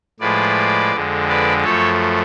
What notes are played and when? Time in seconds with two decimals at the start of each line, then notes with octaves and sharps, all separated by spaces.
0.20 A2 F3 G#3 B4 D5
0.93 F2 D3 G#3
1.28 B4 D5
1.64 F#2 F3 A3 A4 C#5